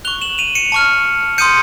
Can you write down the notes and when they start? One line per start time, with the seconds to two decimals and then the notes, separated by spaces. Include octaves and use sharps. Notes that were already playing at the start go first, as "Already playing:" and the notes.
0.05 C#6 F#6 F7 G7
0.22 E7 F#7
0.38 D#7 F7
0.55 C#7 D#7
0.72 A5 C#6 F6
1.38 C6 D#6 G6 C#7 D#7